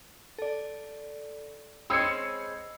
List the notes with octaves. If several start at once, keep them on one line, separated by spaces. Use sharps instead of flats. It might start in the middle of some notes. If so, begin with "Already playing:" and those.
A4 D5
G#3 C4 C#4 D#5 B5 E6 C7 C#7